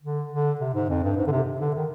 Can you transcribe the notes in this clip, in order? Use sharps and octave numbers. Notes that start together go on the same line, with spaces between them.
D3
D3
C3
G#2
F2
G2
G#2
D3
C3
D3
D#3